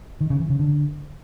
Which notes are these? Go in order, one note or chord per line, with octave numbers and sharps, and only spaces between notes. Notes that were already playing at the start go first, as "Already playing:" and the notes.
D#3
C#3
E3
C#3
D3